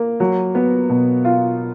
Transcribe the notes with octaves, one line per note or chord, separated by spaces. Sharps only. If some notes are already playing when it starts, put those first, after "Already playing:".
Already playing: A#3
F#3
B3
B2
F4